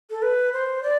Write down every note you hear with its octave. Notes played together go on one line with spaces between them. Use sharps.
A4
B4
C5
D5